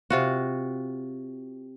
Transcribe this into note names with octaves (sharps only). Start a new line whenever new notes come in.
C3 F4 F#4